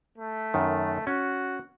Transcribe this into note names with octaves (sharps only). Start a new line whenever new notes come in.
A3
F#2 D#3
C#4 F#4